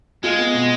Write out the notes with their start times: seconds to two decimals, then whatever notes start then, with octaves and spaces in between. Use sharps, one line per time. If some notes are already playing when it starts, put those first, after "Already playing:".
0.23 G#3 F4
0.38 B3
0.54 B2